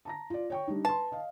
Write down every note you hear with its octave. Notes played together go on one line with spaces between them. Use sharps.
A5 A#5 A#6
F4 D5
C#5 G5 C#6
G3 D4 D#4
B4 A5 C6
D#5 F5